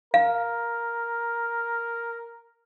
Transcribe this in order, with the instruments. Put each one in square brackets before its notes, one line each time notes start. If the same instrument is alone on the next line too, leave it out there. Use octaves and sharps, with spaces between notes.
[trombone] A#4 [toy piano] F5